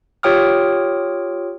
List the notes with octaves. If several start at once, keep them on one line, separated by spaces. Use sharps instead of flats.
F4 G4 C#5 G5 D#6 F6